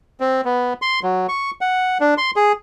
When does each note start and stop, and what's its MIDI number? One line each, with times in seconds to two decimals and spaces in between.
0.20 0.41 60
0.45 0.73 59
0.82 1.00 84
1.03 1.27 54
1.29 1.51 85
1.61 1.98 78
2.00 2.14 62
2.18 2.31 84
2.36 2.52 68